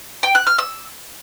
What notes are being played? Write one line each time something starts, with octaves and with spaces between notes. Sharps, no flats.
G5
F#6
F6
E6